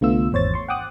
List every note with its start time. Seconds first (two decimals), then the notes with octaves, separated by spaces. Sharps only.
0.01 C2 D3 A3 B3 F4 E6
0.32 G#1 E2 C5 C#5 A6
0.54 C6 C#6
0.69 F#5 G5 D6 D#6 F#6